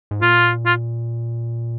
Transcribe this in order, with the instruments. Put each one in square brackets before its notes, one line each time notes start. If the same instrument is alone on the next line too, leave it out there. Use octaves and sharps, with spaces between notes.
[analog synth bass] G#2
[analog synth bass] A#2 [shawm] F4
[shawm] F4